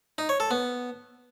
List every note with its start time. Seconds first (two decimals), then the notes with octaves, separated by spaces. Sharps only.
0.18 D#4
0.29 C#5
0.40 A4
0.51 B3